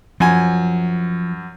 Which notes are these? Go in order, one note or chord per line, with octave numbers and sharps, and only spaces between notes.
F#2 F3 G#5